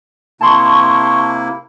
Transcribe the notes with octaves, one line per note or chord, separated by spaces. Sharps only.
C3 A#3 E4 A5 C6 C#6